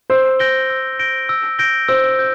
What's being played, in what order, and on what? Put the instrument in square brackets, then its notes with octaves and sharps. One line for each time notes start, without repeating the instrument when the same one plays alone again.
[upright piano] C5 [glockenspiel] E6
[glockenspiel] G6 A#6 D7 G7
E6
G6 A#6 D7 G7
E6
G6 A#6 D7 G7
[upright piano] C5 [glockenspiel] E6
[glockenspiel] G6